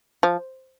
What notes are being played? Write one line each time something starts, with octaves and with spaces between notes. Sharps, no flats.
F3